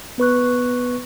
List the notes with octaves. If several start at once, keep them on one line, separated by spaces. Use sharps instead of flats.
B3 B4 C#6 F#6